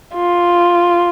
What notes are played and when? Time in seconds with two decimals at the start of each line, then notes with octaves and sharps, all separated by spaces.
0.14 F4